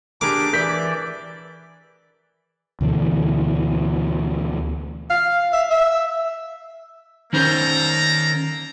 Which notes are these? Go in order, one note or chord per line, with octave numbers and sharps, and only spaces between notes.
D4 G4 G#4 A#4 B4 D6
E3 A#4 D5 G6 B6
D2 B2 E3
F5
E5
E5
D#3 A#3 C#4 A4 C5 A#5